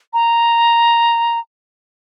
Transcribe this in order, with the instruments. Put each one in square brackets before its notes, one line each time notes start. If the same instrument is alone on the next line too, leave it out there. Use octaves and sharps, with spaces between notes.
[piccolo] A#5